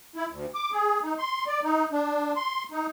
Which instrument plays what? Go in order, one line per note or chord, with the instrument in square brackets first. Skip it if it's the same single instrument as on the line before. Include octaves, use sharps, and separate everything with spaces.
[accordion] E4
D2
D6
G#4
D#4
C6
D5
D#4
D4
C6
D#4